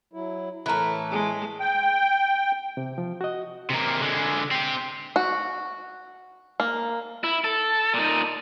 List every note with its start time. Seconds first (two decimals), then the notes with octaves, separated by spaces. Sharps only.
0.13 F#3 E4
0.66 A2 E3 A3 A#4 B4
1.11 G#3
1.60 G5
2.77 C3
2.98 F3
3.21 F#4 D#5
3.70 C3 A#3
4.01 D3 G#3
4.51 C4 G4
5.16 F#4
6.60 A#3
7.24 E4
7.44 A4
7.94 A#2 D#4